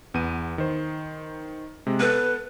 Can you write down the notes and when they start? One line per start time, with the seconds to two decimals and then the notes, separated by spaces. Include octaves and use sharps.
0.14 E2 B3 D#7
0.58 D#3 C5
1.87 C3 G#3
2.00 B3 A4 B4